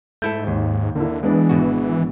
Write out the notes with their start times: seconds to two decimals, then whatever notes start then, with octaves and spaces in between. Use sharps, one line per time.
0.22 G#2 A3 E4 A4 G6
0.47 D#2
0.96 D3 A#3 E4
1.23 E3 G#3 B3 D4
1.49 G#1 B2 F#4